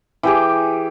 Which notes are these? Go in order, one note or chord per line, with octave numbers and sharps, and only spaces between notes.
E3 G4 G#4